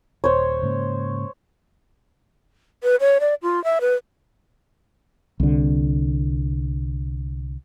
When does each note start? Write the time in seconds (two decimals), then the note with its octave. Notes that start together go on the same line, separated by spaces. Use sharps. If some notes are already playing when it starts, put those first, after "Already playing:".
0.24 D#1 C5 C#5
0.63 G#2 C#3 A#3
2.83 B4
3.01 C#5
3.20 D5
3.43 F4
3.64 E5
3.81 B4
5.40 C2 D3